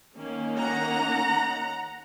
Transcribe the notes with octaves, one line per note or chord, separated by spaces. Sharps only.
D#3 A#3 C#4
F#5 A#5